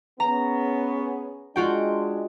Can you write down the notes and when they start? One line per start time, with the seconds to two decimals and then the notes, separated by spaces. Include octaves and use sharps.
0.20 B3 C#4 G#4 A#5
1.56 G#3 D4 F4 F#4 G5